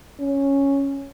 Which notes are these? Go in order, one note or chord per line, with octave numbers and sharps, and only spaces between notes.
C#4